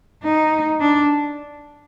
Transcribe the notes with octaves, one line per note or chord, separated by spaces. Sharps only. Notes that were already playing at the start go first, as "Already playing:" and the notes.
D#4
D4